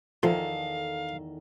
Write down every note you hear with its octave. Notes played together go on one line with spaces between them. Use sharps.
E2 D#3 F3 A4 F5